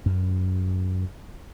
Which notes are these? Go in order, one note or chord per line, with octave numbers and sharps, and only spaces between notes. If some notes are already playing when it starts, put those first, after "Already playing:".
F#2